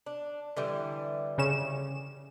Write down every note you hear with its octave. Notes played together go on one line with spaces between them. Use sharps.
D4
D3 E3 G3
C#3 C#4 E7